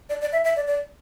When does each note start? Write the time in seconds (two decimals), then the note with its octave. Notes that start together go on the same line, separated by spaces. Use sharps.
0.09 D5
0.21 D5
0.32 E5
0.45 E5
0.56 D5
0.67 D5